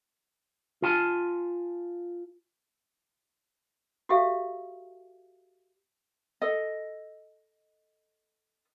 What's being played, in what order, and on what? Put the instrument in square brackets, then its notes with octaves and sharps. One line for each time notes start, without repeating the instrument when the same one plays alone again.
[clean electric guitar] F4 G#5 A5
[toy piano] F#4 G4 A4 E5 F5
[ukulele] A4 D#5